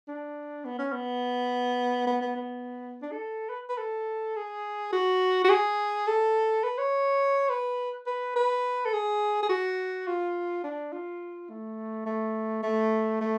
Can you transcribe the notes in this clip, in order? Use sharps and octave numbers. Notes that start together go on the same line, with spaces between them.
D4
B3
C#4
B3
B3
B3
B3
D4
A4
B4
B4
A4
G#4
F#4
F#4
G#4
A4
B4
C#5
B4
B4
B4
A4
G#4
G#4
F#4
F4
D4
F4
A3
A3
A3
A3